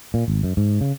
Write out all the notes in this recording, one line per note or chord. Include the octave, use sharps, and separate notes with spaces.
A#2
G#1
F#2
G#2
C#3